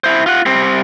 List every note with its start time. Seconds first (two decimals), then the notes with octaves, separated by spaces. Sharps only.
0.04 E4 C5
0.26 F4 F#5
0.46 G3 C4